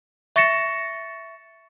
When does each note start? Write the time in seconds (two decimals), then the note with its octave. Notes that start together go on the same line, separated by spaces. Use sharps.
0.36 E5 C#6 A6 A#6 C#7 E7